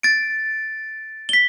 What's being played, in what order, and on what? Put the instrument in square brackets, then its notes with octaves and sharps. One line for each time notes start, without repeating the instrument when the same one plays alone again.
[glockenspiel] A6 D7
G7
B6